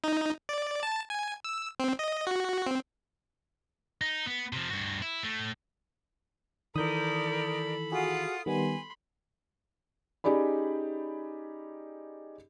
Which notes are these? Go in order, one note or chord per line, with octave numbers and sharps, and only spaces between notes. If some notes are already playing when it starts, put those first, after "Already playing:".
D#4
D5
A5
G#5
E6
C4
D#5
F#4
C4
D#4
B3
C3 F3
G2 F#4
E4
A2 A3
D#3 E3 A4 A#4 D5 B5 D#6 G6
F4 F#4 G#4 F#5 D#6
D#3 G3 B3 G#5 B5 C6
C#4 D#4 G4 G#4 D5 B5